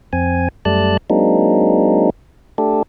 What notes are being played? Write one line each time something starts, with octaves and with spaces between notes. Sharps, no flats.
F2 C4 G#5
F#2 G3 A3 D5 A5 F#6
F#3 G#3 A#3 C4 D4 D#4
A3 D4 G4 A4